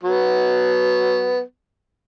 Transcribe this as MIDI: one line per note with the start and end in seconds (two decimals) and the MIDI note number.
0.03 1.42 54
0.03 1.42 59